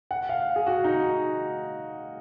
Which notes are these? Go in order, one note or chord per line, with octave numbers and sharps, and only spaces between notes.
F#5
F5
G#4
F#4
D#4